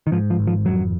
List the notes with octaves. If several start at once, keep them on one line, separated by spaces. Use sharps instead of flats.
D#3
G#2 F3
F3
G#1
F3
F2 F#3